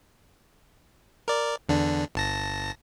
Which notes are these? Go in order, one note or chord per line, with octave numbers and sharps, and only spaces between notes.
A#4 D5
E2 D3 D4
G1 A5 A#6